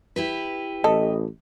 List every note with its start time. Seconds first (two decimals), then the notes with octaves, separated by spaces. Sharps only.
0.16 E4 G4 B4
0.84 A1 A4 D#5